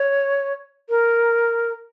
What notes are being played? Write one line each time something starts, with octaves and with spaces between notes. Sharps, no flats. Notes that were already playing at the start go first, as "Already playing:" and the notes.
Already playing: C#5
A#4